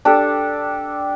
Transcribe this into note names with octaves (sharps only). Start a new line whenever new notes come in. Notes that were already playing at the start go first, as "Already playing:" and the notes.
D4 G4 A4